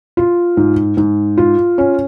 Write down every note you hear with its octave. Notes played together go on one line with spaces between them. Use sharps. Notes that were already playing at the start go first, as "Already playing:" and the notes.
F4
G#2
G#2
F4
C#4